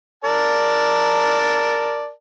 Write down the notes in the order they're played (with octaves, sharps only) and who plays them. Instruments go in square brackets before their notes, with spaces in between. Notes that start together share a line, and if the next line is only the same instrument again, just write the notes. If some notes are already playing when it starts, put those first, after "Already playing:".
[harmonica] A#4 D5 A5